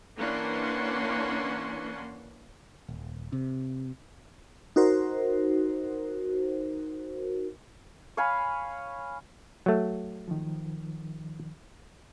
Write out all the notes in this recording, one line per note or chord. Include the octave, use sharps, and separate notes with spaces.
E3 A#3 C#4 D4 F#5 C6
D#1
C3
D#4 F#4 A#4 C5
C#5 F5 G#5 B5
F#3 A3
D#3 F3